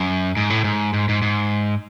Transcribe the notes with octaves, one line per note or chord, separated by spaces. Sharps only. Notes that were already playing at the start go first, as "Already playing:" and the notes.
Already playing: F#2
G#2
A2
G#2
G#2
G#2
G#2